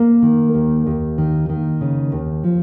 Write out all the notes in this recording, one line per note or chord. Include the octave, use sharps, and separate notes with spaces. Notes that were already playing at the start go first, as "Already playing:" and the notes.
Already playing: A#3
D#3
D#2
D#2
D#3
D#3
C#3
D#2
F3